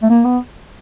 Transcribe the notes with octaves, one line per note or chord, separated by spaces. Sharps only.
A3
A#3
B3